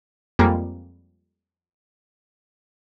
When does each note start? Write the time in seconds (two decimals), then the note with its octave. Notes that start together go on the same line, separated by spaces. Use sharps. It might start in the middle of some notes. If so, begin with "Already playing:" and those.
0.39 F2 G3 G#3 A#3